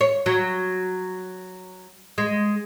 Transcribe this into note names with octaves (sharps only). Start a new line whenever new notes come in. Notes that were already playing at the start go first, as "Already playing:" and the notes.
C#5
F#3
G#3